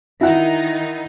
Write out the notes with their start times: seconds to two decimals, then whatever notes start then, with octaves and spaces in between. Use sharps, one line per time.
0.21 D#3 D#4 E4 F#5